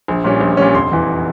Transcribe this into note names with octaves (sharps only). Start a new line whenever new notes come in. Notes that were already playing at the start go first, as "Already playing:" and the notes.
A#1
A#2 G3 C#4
A#1
A#2 G3 C#4
F1 C6
E2 E3